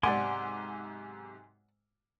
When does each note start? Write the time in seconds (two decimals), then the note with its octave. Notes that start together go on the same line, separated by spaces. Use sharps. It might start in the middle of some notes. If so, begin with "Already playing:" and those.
0.03 B1 G#2 C3 D5 F#5 G#5 C6 D6